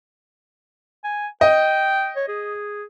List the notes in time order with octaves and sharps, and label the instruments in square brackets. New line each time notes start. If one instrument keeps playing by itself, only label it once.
[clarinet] G#5
[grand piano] D#5 [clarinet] G5
[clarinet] C#5
G#4